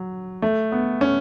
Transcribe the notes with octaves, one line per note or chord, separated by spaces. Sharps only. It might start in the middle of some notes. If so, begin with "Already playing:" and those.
Already playing: F#3
A3
B3
C#4